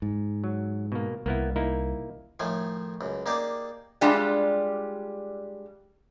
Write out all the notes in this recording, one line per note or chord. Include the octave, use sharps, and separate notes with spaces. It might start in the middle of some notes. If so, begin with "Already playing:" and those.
G#2
F#3
B2 A#3
C2 A#3 B3 E4
A#3 D#4 E4
A2 D#3 F3 A3 G#5
C#2 F#2
A#3 D#4 G4 G#4 D5 A5
G3 G#3 D4 F4 G4